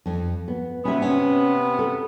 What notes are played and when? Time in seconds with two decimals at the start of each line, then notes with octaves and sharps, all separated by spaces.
0.06 F2
0.48 B3
0.85 C3 B3 C#4 E5
1.02 C#4
1.79 A4